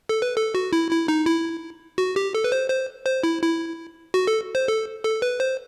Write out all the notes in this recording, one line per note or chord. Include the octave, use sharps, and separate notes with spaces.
A4
B4
A4
F#4
E4
E4
D#4
E4
F#4
G4
A4
B4
C5
C5
C5
E4
E4
F#4
A4
C5
A4
A4
B4
C5